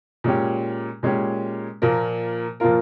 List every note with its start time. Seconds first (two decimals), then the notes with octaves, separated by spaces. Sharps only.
0.24 A#2 G#3 C#4 G4
1.03 A#2 G#3 C#4 G4
1.82 A#2 F3 A#3 F4 A#4
2.60 A#2 F3 A#3 F4 A#4